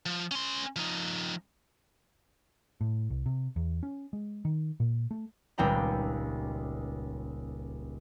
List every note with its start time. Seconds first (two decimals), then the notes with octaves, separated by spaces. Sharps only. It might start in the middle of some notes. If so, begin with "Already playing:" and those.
0.06 F3
0.31 C#4 C6
0.76 F3 D#4
2.81 A2
3.10 C2
3.26 C3
3.56 E2
3.83 C#4
4.13 G#3
4.45 D#3
4.80 A#2
5.11 A3
5.58 D#1 C#2 C4 G5 A#5 B5